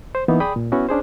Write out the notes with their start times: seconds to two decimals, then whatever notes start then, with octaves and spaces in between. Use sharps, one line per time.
0.15 C5
0.28 E3 A#3 B3 D#4
0.40 G#4 D5 G5 B5 D#6
0.56 A#2
0.72 B3 C#4 E4 F#4
0.89 C#4 D4 G#4 C5